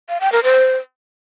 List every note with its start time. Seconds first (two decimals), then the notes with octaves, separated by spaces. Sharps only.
0.09 F5
0.21 G5
0.32 A#4
0.44 C5